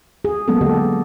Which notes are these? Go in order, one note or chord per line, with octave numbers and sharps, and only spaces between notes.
G#4
F#3 G#3 A#3 B3 C#4 A4
D3 G4 A4 D#5